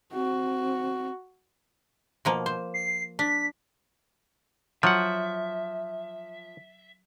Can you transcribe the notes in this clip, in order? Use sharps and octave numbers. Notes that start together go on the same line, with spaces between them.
C4 F#4
B2 F3 A#3
C5
C7
D4 B6
F3 F#3 E5 F#5